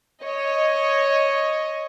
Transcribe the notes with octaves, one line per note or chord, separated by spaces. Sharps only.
C#5 D#5